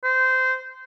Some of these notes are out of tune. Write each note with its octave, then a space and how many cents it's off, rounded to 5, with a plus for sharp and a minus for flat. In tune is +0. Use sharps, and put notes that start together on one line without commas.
C5 -20